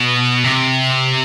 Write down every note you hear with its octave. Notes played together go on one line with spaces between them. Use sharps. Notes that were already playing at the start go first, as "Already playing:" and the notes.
Already playing: B2
C3